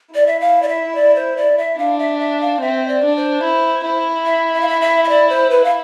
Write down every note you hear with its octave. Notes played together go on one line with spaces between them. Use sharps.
E4 D5
E5
F5
D5
E5
D5
C5
D5
E5
D4 F5
E5
E5
F5
C4 E5
D5
D4
C5
E4
E4
E5
E5
F5
E5
E5
E5
D5
C5
B4
F5